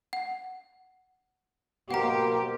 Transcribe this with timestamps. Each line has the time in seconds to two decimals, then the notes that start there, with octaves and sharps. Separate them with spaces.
0.13 F#5
1.91 B2 A#3 G4 A#4 C5 F#5 A#5